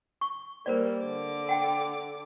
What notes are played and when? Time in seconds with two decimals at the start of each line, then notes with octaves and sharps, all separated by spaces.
0.21 C#6
0.66 G3 A#3 A#4 C5 D5
1.03 D3 D6
1.49 F#5 G5